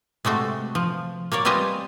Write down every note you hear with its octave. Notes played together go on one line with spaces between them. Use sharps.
C3 G#3 A3 F#4
F3
A#3 A#4 C#5 D5
G3 C4 F4 B4 D#5 G#5